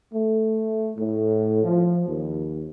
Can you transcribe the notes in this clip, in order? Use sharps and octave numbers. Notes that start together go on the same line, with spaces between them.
A3
A2
F3
D#2